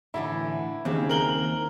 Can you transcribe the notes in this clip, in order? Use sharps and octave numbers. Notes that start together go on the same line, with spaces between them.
A2 D3 E3 E4
D#2 C#3 C4 E4
A#4 F#7 G7